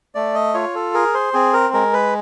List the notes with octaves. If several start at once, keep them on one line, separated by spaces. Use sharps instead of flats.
A3 D5
D#5
F4 C#5
A4
G#4 A#4
C5
C4 G#4
A#4
G#3 A#4
B4